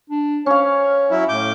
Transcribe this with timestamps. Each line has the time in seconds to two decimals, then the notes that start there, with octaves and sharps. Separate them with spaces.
0.10 D4
0.46 C#4 C#5 F5
1.11 F#3 E4
1.29 A2 D6 G6